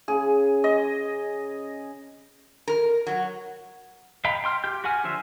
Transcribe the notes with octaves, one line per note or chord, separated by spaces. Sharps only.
C#3 G#4
D#5
A#4
F#3
D#5 F5 G5 A#5 B5
G5 C6 F6
G4 G5 G6
F#4 G4 F#5 G#5 F6
D3 F3 C5 E5